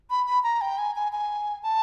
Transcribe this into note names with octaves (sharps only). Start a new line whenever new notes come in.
B5
B5
A#5
G5
G#5
G#5
G#5
A5